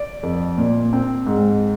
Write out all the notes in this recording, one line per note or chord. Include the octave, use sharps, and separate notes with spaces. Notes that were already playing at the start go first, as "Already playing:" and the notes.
Already playing: D5
F2
A#2
C4
G#2